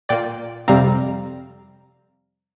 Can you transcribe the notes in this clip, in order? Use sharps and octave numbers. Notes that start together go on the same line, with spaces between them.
A#2 A#3 D5 G5
F2 C3 G3 C4 F5 A#5